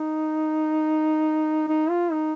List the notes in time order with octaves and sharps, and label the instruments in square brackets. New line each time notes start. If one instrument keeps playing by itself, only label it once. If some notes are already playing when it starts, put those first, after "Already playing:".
Already playing: [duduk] D#4
D#4
F4
D#4